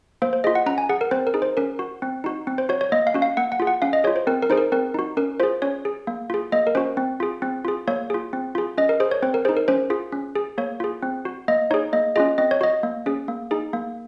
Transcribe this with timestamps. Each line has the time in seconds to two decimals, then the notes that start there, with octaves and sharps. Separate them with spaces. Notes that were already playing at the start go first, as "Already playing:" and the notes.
0.22 A#3 C5
0.33 C5
0.44 F4 G#4 D#5
0.55 F#5
0.66 C#4 A#5
0.78 G#5
0.89 G#4 F#5
1.01 A#4
1.11 C4 C5
1.27 A#4
1.34 D#4 G#4
1.42 C5
1.57 C#4 A#4
1.79 F#4
2.02 C4
2.24 D#4 F#4
2.47 C4
2.58 C5
2.69 F#4 C#5
2.81 C#5
2.92 A#3 D#5
3.07 F5
3.14 C#4 F#4
3.22 F5
3.37 A#3 F#5
3.52 F#5
3.60 F4 G#4
3.67 F#5
3.82 C#4 F5
3.93 D#5
4.04 F4 G#4 C#5
4.16 C5
4.27 C4 A#4
4.42 A#4
4.50 D#4 G#4 C5
4.57 A#4
4.72 C4 A#4
4.94 D#4 F#4
5.17 C#4 A#4
5.40 F4 G#4 C5
5.62 C#4 C#5
5.85 G#4
6.07 A#3
6.30 F4 G#4
6.52 A#3 D#5
6.67 A#4
6.75 C#4 F#4 C5
6.97 C4
7.20 F4 G#4
7.42 C4
7.65 F4 G#4
7.88 A#3 C#5
8.10 F4 G#4
8.33 C4
8.55 F4 G#4
8.78 C#4 D#5
8.89 A#4
9.00 G#4 C5
9.11 C#5
9.22 C4 C5
9.34 A#4
9.45 D#4 G#4 C5
9.57 A#4
9.68 C#4 C5
9.90 F4 G#4
10.12 C#4
10.35 G#4
10.58 A#3 C#5
10.80 F4 G#4
11.03 C4
11.25 F#4
11.48 A#3 D#5
11.71 D#4 G#4 C#5
11.93 A#3 D#5
12.16 C#4 F4 G#4 D#5
12.38 C4 D#5
12.51 C#5
12.61 F#4 D#5
12.83 A#3
13.06 C#4 G#4
13.28 A#3
13.51 D#4 G#4
13.73 A#3